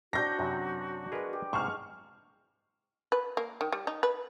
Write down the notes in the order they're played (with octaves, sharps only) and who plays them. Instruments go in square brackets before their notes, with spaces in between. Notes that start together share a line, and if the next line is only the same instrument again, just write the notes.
[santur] F#3 C4 D4 [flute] F#4 [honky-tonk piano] G6 A#6
[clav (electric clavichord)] F#2 C3 F#3 [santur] B5
[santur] G#3 B3 [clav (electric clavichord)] G#4 A#4 B4
[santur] G4
[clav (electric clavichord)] G#2 C3 C5 [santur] G#3 A5 [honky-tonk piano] C#6 F6
[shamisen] B4
A#3
D#3
G3
D#4
B4